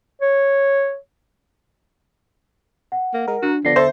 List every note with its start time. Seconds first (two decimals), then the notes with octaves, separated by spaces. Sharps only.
0.21 C#5
2.92 F#5
3.14 A#3
3.28 G#3 A#4
3.43 D4 F#4
3.65 D3 F3 B3 D4 A#6 C7
3.76 A4 C5 E5